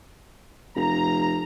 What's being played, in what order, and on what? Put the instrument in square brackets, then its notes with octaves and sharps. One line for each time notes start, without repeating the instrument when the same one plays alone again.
[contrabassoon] F1 [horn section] A#5